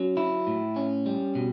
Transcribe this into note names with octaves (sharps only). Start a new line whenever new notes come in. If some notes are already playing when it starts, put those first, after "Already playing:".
Already playing: F#3 C#4
E4
A2
C#4
G3
B2